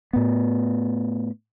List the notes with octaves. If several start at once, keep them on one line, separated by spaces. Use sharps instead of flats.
A2 B3